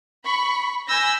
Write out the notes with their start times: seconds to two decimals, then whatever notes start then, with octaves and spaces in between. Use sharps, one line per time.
0.25 B5 C#6
0.87 G#5 B5 E6 G6 A#6